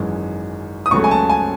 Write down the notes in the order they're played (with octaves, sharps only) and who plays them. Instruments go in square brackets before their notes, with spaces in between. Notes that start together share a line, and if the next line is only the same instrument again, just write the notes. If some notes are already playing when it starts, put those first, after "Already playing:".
Already playing: [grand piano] G#1 F#2 E3 G#3
D#6
C#2 C#3 F#3 A3 C#6
G#5
A5
G#5